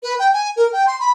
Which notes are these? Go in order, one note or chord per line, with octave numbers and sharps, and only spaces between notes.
B4
G5
G#5
A#4
G5
C6
B5